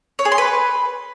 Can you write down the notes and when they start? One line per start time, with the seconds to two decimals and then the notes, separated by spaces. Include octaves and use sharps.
0.19 C#5
0.25 G#4
0.32 C6
0.38 B4